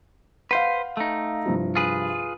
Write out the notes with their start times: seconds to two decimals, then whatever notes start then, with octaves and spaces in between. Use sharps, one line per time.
0.51 B4 C5 F5 F#5
0.97 A3 D#4
1.46 C2 G2 F3
1.75 F4 G#4 B4